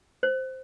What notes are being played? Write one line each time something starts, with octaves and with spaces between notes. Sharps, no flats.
C5